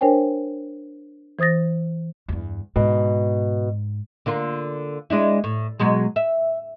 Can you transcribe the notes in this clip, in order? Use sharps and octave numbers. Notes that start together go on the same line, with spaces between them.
D4 A#4 C5 C#5 G5 G#5
E3 C5 D#6 A6 A#6
E2 G2
G#2 B2
D3 A#3 F4
G#3 D4 E4
A2
B2 F#3 G#3
E5